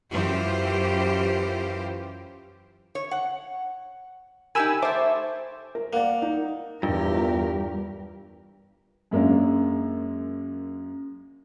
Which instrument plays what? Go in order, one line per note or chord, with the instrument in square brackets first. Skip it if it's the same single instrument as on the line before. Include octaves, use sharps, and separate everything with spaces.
[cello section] F#2 E3 F4 G4 C5
[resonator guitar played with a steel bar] C#5
F#5
[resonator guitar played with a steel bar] D#4 G4 A#4 [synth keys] G#5 B5 E6
[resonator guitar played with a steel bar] A3 E5 [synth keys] C5 A5 D6
[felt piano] A#4
[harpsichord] A#3 [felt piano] D5 F#5
[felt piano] D#4
[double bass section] E2 [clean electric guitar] G2 [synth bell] F4 [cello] G4 A#4
[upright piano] F#2 G#3 A#3 C#4 D4